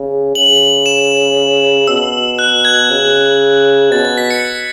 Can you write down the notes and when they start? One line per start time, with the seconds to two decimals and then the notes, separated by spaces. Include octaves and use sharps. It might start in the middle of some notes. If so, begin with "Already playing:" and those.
Already playing: C#3
0.35 C#3 F#7
0.86 E7
1.87 B2 E6
2.39 F#6
2.65 G#6
2.90 C#3
3.91 B2 A6
4.05 A6
4.18 B6
4.31 C#7